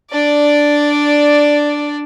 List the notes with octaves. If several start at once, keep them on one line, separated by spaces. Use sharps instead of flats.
D4 D5